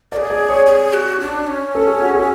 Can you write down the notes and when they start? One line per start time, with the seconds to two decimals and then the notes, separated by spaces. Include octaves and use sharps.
0.12 A#4 D5
0.17 G#4
0.30 D5
0.49 C#5
0.66 G#4
0.93 F#4
1.20 D4
1.47 C#4
1.75 A4
1.87 G#4
2.02 F#4
2.15 G#4